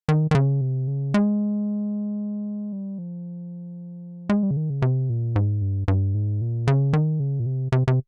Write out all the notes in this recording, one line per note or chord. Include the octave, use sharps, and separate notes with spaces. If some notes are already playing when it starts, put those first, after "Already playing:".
D#3
D#3
C#3
C3
C#3
G#3
G3
F3
G#3
G3
C#3
D#3
C#3
C3
A#2
G#2
G2
G2
G#2
A#2
C#3
D#3
C#3
A#2
C3
C3
C3